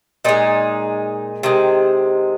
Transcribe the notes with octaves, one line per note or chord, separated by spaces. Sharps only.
A#2 G#3 D#4
C3 D#3 G#3